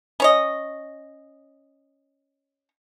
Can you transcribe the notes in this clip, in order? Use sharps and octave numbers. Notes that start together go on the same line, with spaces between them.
C#4 C#5 D#5